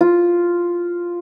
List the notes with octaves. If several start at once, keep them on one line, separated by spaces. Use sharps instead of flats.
F4